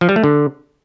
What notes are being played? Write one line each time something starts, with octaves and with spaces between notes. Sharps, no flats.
F3
G3
A3
D3